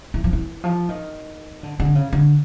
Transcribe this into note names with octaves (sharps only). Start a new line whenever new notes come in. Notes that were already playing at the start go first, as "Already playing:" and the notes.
E3
F3
E3
F3
D#3
D3
D3
C#3
D3